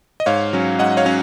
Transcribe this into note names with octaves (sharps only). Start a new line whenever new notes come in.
D#5
G#2 C#5 F5
F#3 C#4
G#2 D#5 F#5
C#5 F5
F#3 C#4